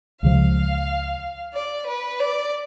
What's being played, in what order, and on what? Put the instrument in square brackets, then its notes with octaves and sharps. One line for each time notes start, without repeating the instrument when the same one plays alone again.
[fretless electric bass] C#2 C#3 F3 [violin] F5
[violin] D5
B4
D5